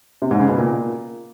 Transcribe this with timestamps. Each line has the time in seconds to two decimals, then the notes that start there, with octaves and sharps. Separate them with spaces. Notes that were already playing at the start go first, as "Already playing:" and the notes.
0.22 C3
0.31 G#2
0.40 C#3
0.48 B2
0.57 A#2